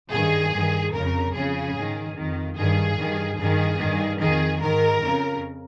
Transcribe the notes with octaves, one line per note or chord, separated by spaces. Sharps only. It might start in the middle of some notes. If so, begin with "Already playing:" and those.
G2 D#3 G#4
G2 D#3
F2 C#3 A#4
F2 C#3 G#4
G#2 D#3
F2 D#3
G2 D#3 G#4
G2 D#3
G2 D#3 G#4
G2 D#3
F2 D#3 G#4
G#2 D#3 A#4
F2 C#3